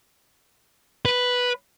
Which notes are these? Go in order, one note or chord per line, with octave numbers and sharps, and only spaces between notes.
B4